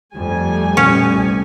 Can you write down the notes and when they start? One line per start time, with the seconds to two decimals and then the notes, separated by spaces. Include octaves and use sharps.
0.14 F2 G3 A3 G#5
0.77 A#2 B3 C#4
1.11 C2